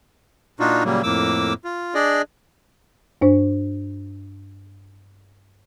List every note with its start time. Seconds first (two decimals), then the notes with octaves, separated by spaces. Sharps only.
0.60 A#2 D4 D#4 F4 F#4
0.85 A#2 C#3 F#3 G3 A#3
1.03 F2 A2 A#3 D6 E6
1.65 F4
1.94 D4 G#4 D5 D#5
3.21 G2 D4 C5